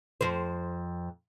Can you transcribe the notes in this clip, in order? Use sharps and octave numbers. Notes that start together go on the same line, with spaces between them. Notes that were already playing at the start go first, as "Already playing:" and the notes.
F2 C5